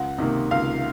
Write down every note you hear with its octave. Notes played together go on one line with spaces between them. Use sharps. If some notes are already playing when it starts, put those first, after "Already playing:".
Already playing: C#2 F#5
C3 D#3 A#3
C#2 F5